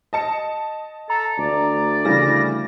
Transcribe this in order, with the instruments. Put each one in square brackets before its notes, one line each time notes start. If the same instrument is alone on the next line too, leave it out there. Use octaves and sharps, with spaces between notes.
[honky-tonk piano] D#5 A5 C#7
[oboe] A4 [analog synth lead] A#5
[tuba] D2 [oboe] D5
[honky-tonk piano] C#3 E3 G3 [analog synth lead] A#6